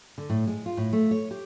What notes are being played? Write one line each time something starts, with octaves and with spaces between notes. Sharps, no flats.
D3
A2
G#3
F4
A2
A3
C#5
G4